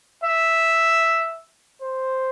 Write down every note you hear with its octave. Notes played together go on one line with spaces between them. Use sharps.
E5
C5